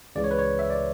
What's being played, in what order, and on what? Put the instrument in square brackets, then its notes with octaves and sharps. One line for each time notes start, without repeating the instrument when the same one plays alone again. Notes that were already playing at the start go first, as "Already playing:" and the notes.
[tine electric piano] C#2 C#3 E3 D5
C#5
B4
C#5
E5
D5